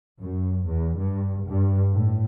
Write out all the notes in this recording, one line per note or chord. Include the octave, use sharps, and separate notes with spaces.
F#2
E2
G2
G2
A2